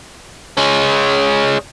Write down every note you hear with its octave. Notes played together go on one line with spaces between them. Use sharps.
G#3 C#4